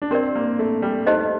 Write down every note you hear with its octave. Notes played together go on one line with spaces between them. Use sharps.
D4
C4 G4 A#4 D5
A#3
A3
G3
A3 D#4 G4 C5 D#5